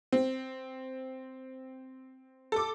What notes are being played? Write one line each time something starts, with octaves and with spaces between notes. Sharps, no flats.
C4
A4 D6